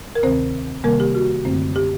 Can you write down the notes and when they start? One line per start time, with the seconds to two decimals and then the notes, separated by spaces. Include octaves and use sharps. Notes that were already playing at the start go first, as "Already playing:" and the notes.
0.15 A#4
0.23 D2 C3 D#3 C4 C5
0.84 C3 D#3 G3 A#3 A#4
1.00 G4
1.15 F#4
1.45 F#2 D3 A3 C4
1.76 G4